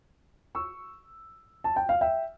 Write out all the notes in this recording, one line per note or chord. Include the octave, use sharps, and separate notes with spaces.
C#6 E6
A5
G5
F5
E5 G5